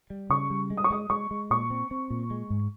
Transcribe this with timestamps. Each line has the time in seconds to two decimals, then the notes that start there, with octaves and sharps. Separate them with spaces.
0.10 G3
0.30 C#3 C#6
0.50 G3
0.70 G#3
0.77 D#6
0.84 C#6
0.90 G#3 D#6
1.10 G#3 C#6
1.31 G#3
1.50 A#2 C#6
1.70 C4
1.91 C4
2.10 A#2
2.31 G#3
2.50 G#2